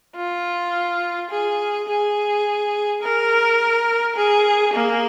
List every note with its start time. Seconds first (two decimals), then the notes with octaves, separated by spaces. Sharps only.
0.16 F4
1.30 G#4
1.88 G#4
3.02 A#4
4.16 G#4
4.74 A#3